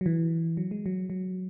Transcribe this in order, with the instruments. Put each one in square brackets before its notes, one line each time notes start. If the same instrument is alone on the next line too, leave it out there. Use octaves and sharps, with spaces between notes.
[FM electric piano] F#3
E3
F#3
G#3
F#3
F#3